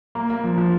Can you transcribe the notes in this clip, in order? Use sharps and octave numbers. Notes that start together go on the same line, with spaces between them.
A#3
A#3
F3
F3